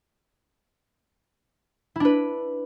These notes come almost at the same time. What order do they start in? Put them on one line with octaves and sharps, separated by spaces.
E4 D4 B4